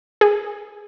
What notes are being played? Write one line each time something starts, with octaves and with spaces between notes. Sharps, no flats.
G#4